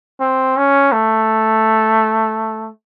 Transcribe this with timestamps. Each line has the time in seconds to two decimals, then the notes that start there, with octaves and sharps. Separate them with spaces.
0.20 C4
0.57 C#4
0.92 A3